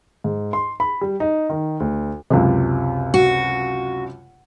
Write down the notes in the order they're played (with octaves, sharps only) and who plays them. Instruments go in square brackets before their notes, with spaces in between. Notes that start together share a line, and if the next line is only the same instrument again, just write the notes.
[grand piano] G#2
C6
B5
G3
D#4
D#3
D2
[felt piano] C#2 F#2 C3
[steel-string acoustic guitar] F#4